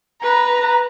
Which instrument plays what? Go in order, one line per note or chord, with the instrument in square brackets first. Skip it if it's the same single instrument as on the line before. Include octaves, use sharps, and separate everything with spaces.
[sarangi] B4 [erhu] A#5